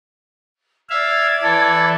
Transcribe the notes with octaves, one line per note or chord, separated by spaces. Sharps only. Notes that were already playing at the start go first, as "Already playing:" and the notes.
D5 E5 F5 G#6
E3 E4 A4